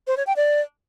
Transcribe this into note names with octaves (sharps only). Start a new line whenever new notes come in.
C5
C#5
G5
D5